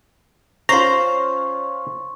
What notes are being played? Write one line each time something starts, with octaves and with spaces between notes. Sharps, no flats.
C#4 F4 C5 A#5 C6 C#6